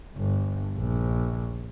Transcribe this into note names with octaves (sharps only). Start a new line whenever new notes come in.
G1
A#1